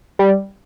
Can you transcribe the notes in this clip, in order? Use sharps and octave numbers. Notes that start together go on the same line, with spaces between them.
G3